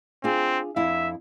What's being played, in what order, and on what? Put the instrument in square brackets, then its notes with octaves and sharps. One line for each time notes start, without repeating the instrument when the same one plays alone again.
[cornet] C4 [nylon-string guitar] D4 F4 G#4
[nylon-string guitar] F2 E4 F5 [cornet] E5